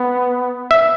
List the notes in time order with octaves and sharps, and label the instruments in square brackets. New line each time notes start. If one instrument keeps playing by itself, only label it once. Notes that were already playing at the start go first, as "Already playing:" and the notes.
Already playing: [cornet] B3
[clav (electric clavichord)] E5